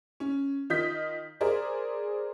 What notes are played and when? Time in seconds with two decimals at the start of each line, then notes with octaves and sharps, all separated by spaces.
0.20 C#4
0.70 D#3 F4 D#5 G6 B6
1.41 G#4 A#4 C5 D5